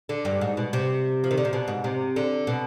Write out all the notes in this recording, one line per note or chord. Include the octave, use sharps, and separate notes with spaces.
D3
G2
G#2
B2
C3
F3
D#3
D3
C3
B2
G#2
C3
D3
B2